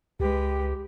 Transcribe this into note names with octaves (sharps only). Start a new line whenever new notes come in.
C#2 G#3 G4 B4